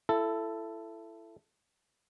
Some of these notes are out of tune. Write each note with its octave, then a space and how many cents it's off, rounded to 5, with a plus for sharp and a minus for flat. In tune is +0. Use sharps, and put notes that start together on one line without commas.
E4 +25 A4 +5